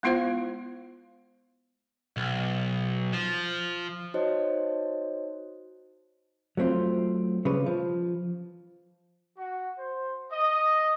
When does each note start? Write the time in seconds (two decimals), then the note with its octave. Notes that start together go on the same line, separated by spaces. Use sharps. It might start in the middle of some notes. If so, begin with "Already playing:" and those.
0.03 G#3 B3 E4 F4 C5 F5
2.17 B1
3.13 F3
4.14 D#4 F#4 C5 C#5 D#5
6.57 F#3 A3 C4 F4
7.45 C#3 G3 B4
7.66 F3
9.36 F#4
9.77 C5
10.31 D#5